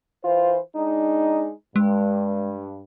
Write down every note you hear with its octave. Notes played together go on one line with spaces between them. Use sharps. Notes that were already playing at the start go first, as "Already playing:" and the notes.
E3 F4 C5
G#3 D4 D#4
G2 G#3